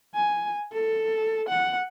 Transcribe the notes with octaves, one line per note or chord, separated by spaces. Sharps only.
G#5
A4
F#5